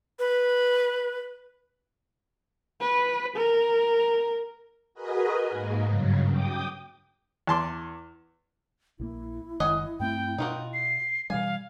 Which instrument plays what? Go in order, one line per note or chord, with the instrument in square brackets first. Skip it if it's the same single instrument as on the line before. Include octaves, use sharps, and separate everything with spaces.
[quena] B4
[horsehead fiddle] B4
A#4
[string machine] F#4 G#4 A#4 B4 D#5
G#2 A#3
G2 C#3 F#3
G5 D6 D#6
[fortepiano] E2 A5 C6 D6
[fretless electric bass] A#1 C#3 A#3 [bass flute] E4
[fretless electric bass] F#1 D#3 G#3 [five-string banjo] D#5 F#5 G#5
[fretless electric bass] G2 A3 C4 [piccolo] G5
[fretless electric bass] B2 [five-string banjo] D#4 F4 F#4
[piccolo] C7
[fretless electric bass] B2 E3 G3 [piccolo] F5 [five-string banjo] G#5